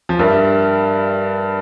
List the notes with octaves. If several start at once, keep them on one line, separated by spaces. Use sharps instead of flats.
F3
G2 G3 G4 A#4 E5